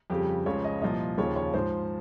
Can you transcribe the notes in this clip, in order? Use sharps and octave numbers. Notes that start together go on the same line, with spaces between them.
F2 C#3 G3 G4
C#2 C#3 F3 C#5
D#5
C2 A#2 F3 D#5
D#2 C#3 F3 C#5
C#5
G#2 F3 C5